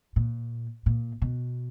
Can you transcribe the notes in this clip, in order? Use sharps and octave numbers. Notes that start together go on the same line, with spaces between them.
A#2
A#2
B2